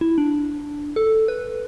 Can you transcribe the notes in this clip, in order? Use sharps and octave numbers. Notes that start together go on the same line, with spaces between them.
E4
D4
A4
B4